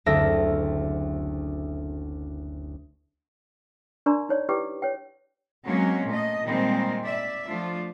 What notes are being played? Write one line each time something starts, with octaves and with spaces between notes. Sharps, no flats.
F#1 D2 C4 D4 E5 A#6
D4 A#4 D5 A#5 C6 C#6
D#4 C#5 D5
E4 G4 B4 D5 G5 D6
C#5 G5
F#3 G#3 A#3 C4 C#4 C#5
A#2 A3 D#5
A#2 D#3 G3 G#3 C4
D5 E5
F3 A3 D4 F4